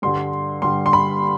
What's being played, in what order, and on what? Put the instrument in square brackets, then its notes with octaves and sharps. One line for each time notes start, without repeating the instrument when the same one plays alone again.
[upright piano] G2 D3 G3 C6
G2 D3 G3 C6
C6
B5